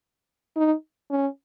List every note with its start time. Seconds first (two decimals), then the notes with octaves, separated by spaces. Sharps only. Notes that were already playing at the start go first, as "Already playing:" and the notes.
0.56 D#4
1.11 C#4